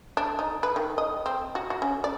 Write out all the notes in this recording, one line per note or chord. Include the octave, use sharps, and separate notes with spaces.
D4
D#4
B4
D#3
D#5
C4
F#4
F#4
C#4
D5